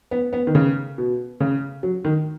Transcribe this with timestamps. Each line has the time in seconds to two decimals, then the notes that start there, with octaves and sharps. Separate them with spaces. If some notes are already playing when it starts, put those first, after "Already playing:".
0.11 B3
0.33 B3
0.47 D#3
0.55 C#3
0.98 B2
1.40 C#3
1.83 F#3
2.05 D#3